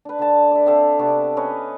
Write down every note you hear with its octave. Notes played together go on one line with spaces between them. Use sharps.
D4 B4
D3 A5
D5 E5
C4 A4 E5 F5
C3 B3 D4 C#6
C#4 B4 C#5 D#5